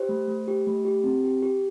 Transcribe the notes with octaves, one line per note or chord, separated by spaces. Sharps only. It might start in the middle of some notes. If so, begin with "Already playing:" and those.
Already playing: G4 C5
A3
A3
G4
A3
G4
C4
G4
G4